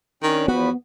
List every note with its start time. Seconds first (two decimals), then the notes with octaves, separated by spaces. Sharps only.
0.23 D#3 C#4 D4
0.48 E2 F3 B3 F#4 B4